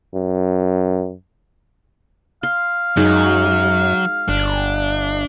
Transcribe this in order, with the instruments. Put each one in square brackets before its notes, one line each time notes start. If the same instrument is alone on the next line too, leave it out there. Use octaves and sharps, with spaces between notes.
[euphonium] F#2
[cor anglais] F5 [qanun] C6
[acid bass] F#2 [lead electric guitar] F#3 [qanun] G#3 D#4 F#4
[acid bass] G1 [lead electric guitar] D4